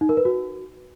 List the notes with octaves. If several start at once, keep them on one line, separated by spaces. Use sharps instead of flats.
D#4
A#4
B4
F#4